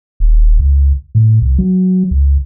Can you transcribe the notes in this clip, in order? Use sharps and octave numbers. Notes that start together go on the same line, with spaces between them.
D#1
C#2
A2
C2
F#3
C#2